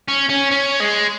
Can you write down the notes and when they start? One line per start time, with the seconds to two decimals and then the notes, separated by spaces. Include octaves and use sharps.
0.08 C#4
0.30 C#4
0.51 C#4
0.80 G#3